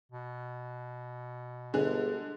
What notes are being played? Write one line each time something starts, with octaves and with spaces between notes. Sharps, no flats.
B2
G1 D3 G#3 G#4